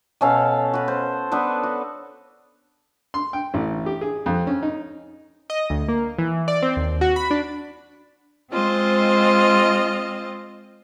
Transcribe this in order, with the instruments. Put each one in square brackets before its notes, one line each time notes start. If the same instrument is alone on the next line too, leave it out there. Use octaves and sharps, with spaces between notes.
[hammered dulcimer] B2 C#4 A4 F5
F#4 B4
C5
B3 D4 A4 B4
F#4
[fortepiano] C6
G5
A1
G4
G#4
F2
C#4
D#4
[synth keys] D#5
D2
A#3
E3
D5
C4
D#2
F#4
B5
D4
[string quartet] G#3 C4 F4 C5 D#5